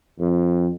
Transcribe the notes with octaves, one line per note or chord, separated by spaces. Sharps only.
F2